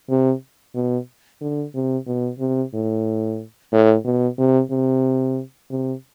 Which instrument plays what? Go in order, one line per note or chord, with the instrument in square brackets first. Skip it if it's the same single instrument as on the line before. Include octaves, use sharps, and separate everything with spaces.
[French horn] C3
B2
D3
C3
B2
C3
A2
A2
B2
C3
C3
C3